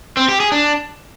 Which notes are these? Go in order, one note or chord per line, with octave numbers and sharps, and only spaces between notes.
C4
G4
G#4
D4